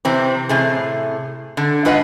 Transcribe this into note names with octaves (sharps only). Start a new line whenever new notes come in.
C3 E3 C4
A2 C3 G#4
D3
G#2 F4 B4 D#5 F#5